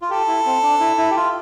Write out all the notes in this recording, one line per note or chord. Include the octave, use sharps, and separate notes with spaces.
F4
G4 A4
E4
C4
D4
E4
E4
G4
F4